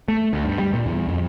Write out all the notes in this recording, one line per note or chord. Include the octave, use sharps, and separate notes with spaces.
A3
D2
G2
G3
A#2
E2
F2